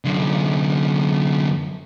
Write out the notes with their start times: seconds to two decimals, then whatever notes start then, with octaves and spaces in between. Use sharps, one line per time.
0.05 F#2 D3